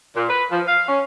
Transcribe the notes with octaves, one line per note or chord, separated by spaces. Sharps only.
A#2
B4
F3
F5
C#4